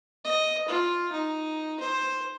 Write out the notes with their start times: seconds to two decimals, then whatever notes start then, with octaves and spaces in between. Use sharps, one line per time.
0.25 D#5
0.68 F4
1.12 D#4
1.80 C5